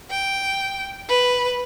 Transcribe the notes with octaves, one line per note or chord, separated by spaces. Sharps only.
G5
B4